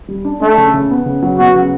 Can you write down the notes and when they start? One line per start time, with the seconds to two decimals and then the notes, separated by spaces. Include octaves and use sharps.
0.08 G3
0.25 D4
0.41 A3 D4
0.57 C#3
0.74 C#3
0.91 B3
1.06 C#3
1.23 F#3
1.38 B3 F#4
1.55 C#3